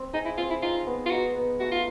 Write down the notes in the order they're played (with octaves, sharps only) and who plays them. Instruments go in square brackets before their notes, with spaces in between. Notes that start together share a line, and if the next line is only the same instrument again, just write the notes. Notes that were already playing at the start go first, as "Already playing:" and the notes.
Already playing: [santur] C4
[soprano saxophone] D#4 [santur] G#4
[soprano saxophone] E4
[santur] C4 [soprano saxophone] F4
[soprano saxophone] E4
[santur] D#4 [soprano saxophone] F4
[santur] B3
[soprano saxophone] F4
[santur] D#4 [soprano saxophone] F#4
[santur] B3
[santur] A3 [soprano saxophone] F#4
[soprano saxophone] F4